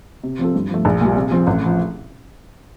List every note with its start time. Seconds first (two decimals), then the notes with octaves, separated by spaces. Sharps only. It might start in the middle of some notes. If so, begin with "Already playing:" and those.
0.23 C3
0.39 F3 C4 F4 A4
0.55 G2
0.69 F3 A3
0.85 A#1
1.01 A#2 G3
1.16 C3
1.31 F3 C4
1.47 A1
1.66 F3